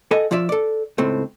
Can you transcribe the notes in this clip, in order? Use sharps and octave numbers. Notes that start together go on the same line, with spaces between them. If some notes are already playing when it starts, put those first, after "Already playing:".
A4 D#5 F#5 G#5
F3 F4 D5 E5
A4 D5
C#2 A2 A3 C4